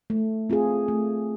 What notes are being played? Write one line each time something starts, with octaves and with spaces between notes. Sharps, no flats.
A3
C4 F4 G#4
A3